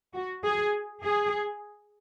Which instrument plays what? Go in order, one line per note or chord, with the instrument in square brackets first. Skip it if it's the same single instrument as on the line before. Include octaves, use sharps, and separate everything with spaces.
[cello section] F#4
G#4
G#4